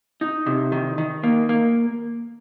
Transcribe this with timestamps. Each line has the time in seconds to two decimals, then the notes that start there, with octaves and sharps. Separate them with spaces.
0.21 D#4
0.46 C3
0.72 D#3
0.98 D#3
1.23 A#3
1.49 A#3